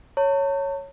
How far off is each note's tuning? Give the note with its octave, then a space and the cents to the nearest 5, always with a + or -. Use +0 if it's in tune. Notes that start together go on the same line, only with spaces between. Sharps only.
C#5 +0 A5 +45